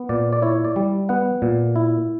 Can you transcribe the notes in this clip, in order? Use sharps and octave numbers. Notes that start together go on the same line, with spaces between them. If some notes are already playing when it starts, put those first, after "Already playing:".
Already playing: B3
A#2 D5
D5
E4 C#5
D5
G3
B3 F#5
A#2
E4